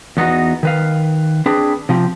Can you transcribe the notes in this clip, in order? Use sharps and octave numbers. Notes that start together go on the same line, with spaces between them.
E2 B3 D#4 F#4
D#3 B4 F5
C4 D4 G#4 B4
C3 F3 C4 G4